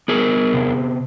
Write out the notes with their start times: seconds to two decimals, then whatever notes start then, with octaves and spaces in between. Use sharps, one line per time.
0.08 B3 G#4 A#4
0.54 C3